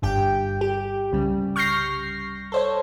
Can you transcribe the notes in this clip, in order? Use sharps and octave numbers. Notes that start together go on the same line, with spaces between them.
G1 G2 G4 G5
G4
C2 C#3 G3
C#6 F6 G6 A#6 C7
A4 C5 C#5